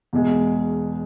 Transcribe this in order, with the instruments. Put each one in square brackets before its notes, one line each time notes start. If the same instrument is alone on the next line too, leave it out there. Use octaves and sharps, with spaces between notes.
[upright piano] E2 B2 G#3